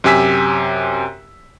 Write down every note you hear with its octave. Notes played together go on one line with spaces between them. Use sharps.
F#2 C3 G4 G#5 E6 B6